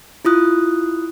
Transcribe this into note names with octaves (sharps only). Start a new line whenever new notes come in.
E4 F4 D#6 F#6